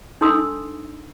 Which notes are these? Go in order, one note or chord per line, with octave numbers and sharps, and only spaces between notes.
D4 D#4 A4 C6 D#6 E6